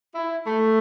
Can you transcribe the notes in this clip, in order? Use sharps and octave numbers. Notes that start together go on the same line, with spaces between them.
E4
A3